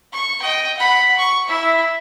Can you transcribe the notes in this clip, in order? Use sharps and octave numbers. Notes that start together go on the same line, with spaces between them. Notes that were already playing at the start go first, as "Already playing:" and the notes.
C#6
D#5 G5
F#5 B5
C#6
E4 E5